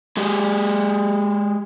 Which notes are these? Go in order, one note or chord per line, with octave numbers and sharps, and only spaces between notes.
G#3 G4 G#4